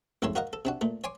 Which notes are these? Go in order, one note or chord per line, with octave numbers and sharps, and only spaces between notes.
A1 F2 G#2 A4 C#5 C6
F#4 A#4 D#5 F5 F#5
A4
C3 D4 F#4
A#2 A3
C#5 G#5 C6 D6